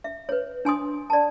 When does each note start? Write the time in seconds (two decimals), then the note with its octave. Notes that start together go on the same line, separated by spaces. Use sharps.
0.04 E5
0.29 B4 C#5
0.65 D4 G#5 C6 D#6
1.10 D5 A5